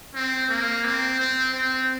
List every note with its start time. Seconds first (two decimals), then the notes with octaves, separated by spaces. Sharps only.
0.14 C4
0.49 A#3
0.85 C4
1.19 C4
1.54 C4